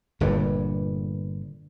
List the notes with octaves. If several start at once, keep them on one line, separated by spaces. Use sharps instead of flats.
G1 G2 A#2